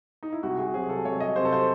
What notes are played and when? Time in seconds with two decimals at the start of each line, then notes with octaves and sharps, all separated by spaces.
0.23 D#4
0.33 E4
0.43 C2 F#4
0.58 G#4
0.74 C3 F#3 C4 G#4
0.89 A4
1.05 C2 C#5
1.20 D#5
1.36 C3 F#3 C4 C5
1.45 A4
1.53 C5